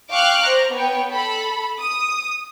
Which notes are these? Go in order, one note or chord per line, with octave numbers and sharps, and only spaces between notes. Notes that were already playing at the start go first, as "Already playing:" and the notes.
F5 G5 C#6 D6 F6 F#6
C5 A#5
B3 C#5 G5
A4 B5
D#6